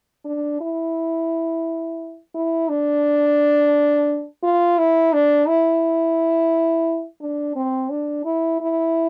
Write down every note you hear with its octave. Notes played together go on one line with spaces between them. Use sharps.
D4
E4
E4
D4
F4
E4
D4
E4
D4
C4
D4
E4
E4